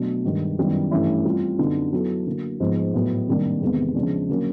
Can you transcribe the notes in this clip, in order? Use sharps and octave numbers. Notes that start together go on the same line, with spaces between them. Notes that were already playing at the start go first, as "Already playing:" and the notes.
Already playing: B2 F#3 A3 D4
G2 D#3 G#3
F#2 D#3 G3 B3 E4
G2 E3 A3 C#4 E4
G3 C4 F4
F#2 D3 F#3 B3 D#4
F#3 B3 E4 A4
D3 F#3 A#3
G#2 F3 G#3 B3
A2 F#3 B3
C3 D#3 G3 A#3 D4
E2 C3 D#3 G#3 B3
C#3 F3 G#3 B3 D4
D3 F#3 A#3 C#4